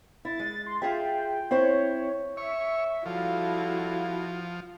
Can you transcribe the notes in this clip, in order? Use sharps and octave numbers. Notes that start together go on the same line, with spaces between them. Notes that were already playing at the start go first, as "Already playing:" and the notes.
E4 A6
G#3
C6
F4 G#4 E5 G5
G5
C4 E4 C5 C#5
C#5 E5
F3 G3 E4 F#4 A4 F5